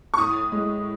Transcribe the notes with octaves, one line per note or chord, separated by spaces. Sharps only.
C#6
A2 D#6
G#3